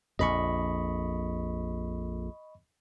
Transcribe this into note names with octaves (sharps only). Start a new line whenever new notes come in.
A#1 F2 D#5 B5 C#6